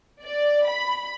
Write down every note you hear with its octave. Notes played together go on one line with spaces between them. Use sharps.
D5
B5